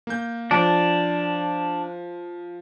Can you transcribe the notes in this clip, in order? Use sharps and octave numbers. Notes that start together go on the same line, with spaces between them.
A#3 G6
F3 D4